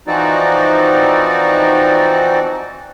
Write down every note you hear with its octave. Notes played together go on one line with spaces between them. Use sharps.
E3 F3 C4 D#4 F#4 D5